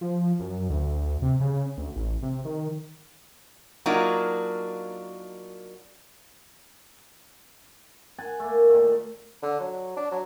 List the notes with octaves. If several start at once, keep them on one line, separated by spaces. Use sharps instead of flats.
F3
F#2
D2
C3
C#3
D2
A1
C3
D#3
F#3 A#3 D4 D#4 F4 F#4
F#5 G#5 A5
A3 A#3
A#2 D#3 A3
D3
F#3
D4
F#3